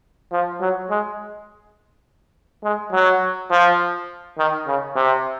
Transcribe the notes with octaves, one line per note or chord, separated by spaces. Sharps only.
F3
F#3
G#3
G#3
F#3
F3
D#3
C#3
C3